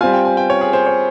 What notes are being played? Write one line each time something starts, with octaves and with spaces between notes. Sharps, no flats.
G3 C4 F4 G#5
G5
G#5
G5
C#5
G#4
C5
C#5